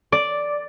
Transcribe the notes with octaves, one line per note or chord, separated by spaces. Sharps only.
D5